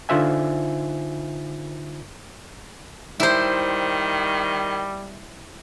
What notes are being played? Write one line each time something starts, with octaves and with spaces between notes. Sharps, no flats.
D3 D#4 F4 C5 E5 G#5
D#3 G3 E4 C5